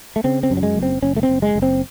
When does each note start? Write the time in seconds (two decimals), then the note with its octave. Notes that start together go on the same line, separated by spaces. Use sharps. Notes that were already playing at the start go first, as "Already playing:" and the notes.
0.16 A3
0.24 C#3 C4
0.43 C4
0.50 F#2
0.57 F#3
0.63 G#3
0.76 F#1
0.83 C4
1.02 F#1 C#4
1.16 A3
1.23 C4
1.29 F#1
1.42 G#3
1.55 F#1
1.62 C4